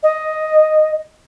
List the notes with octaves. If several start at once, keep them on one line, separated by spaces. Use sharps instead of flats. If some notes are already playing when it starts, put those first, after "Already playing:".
D#5